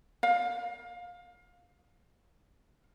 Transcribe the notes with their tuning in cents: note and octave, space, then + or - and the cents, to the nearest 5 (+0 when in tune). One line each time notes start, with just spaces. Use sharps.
F5 +25